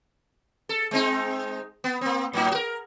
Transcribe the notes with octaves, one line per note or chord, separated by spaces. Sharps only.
A4
G#3 C4 D#4
B3
A#3 C4
A2 F#3 D#4
F#4 A#4